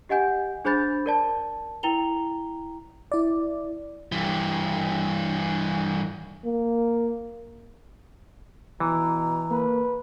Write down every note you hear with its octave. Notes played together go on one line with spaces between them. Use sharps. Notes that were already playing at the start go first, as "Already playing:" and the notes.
G4 D#5 F#5 G#5 G6
D4 G#4 C5 B5 G6 A6
A#4 D5 A5
E4 G5 A#5 F7 G7
E4 D5
G2 E3
A#3
B2 E3 A#5
A#3 B4